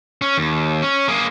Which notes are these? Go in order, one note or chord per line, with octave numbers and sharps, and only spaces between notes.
C#4
D#2
C#4
A#3 G#4